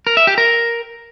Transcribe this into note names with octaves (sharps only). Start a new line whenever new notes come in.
A#4
E5
G4
A#4